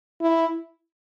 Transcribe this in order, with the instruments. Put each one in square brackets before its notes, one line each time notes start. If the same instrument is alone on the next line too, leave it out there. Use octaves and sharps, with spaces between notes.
[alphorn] E4